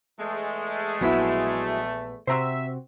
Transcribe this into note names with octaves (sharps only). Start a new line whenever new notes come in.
E2 G#3 A3
A#1 F#3 B3 E4 B6
C3 C4 F#4 C5 E5 A#5